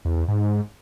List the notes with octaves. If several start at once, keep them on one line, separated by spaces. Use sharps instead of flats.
E2
E2
G#2